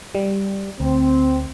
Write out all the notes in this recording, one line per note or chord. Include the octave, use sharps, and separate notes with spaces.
G3
D2 C4